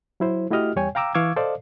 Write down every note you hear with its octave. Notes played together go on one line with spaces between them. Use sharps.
F#3 E4 C5
A3 E4 F#4 G4 D#5 F6
E2 G3 C#5 G5 G#5
F5 G5 A#5 D6 E6
E3 F5 C#6 D6 E6 G#6
A4 C5 D5 D#5 F5